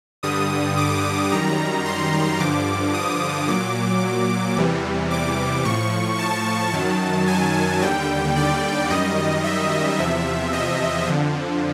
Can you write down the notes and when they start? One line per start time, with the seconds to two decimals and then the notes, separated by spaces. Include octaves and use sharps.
0.23 G2 D3 G3 D#6
0.77 D6
1.31 F#2 D#3 G3 A#5
1.85 C6
2.39 G2 D3 F3 D6
2.94 D#6
3.48 A#2 F#3 D6
4.57 E2 C3 E3 G3
5.11 D6
5.65 A2 F3 C#6
6.19 A5
6.73 F#2 D#3 F#3 A5
7.27 G#5
7.82 D#2 D3 G3 G5
8.36 D5
8.90 F#2 D#3 G3 D#5
9.44 E5
9.98 E2 C3 F3 E5
10.53 D#5
11.07 F2 D3 F3